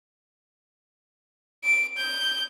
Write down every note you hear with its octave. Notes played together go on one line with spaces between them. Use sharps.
D7
G6